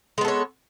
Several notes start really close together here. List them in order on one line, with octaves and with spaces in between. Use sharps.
G#3 B3 A4 C#5